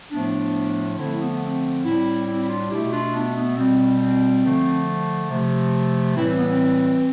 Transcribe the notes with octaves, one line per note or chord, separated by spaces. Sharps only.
A2 F3 A3 B3 D4
D3 F3 A3 C4 E4
C4
B3
C4
A2 G3 C4 E4
C4 E4
E4
D4 F4
B2 A3 E4 G4
D4 F4
B3 D4
B3
B2 G3 C4
C4
D3 F3 A3
C3 F3 A3
A2 E3 G3 C4 E4
C4
B3
C4